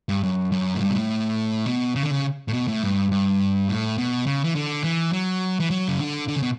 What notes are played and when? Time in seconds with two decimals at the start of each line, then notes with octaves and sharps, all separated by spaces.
0.09 G2
0.23 F#2
0.52 F#2
0.75 A2
0.81 G2
0.91 B2
0.95 A2
1.67 B2
1.96 C#3
2.03 D3
2.11 C#3
2.48 A2
2.53 B2
2.68 A2
2.83 G2
3.11 G2
3.69 A2
3.98 B2
4.26 C#3
4.44 E3
4.55 D3
4.84 E3
5.13 F#3
5.60 E3
5.70 F#3
5.88 C#3
6.00 D3
6.28 D3
6.36 C#3
6.42 B2